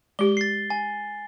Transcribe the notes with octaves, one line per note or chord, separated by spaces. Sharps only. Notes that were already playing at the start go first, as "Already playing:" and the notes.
G#3 G4 G7
A6 C7
G#5